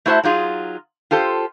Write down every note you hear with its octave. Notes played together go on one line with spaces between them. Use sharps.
A3 E4 F#4 C5 E5 A5
F#3 D#4 F4 G#4
F4 G4 A4 C5